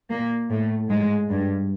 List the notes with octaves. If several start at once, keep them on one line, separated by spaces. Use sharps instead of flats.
A#2 A#3
A2 A3
G#2 G#3
G2 G3